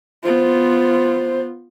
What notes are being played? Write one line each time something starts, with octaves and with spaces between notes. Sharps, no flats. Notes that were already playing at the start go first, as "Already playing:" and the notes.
B3 F4 C5